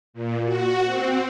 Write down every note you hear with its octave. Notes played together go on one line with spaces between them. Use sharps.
A#2
F#4
C4